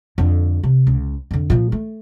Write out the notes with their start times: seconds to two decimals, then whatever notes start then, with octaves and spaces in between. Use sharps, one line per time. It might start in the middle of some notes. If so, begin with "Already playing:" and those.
0.18 F2 D3
0.63 C3
0.87 C#2
1.31 F2 D3
1.50 A#2 F3
1.72 A3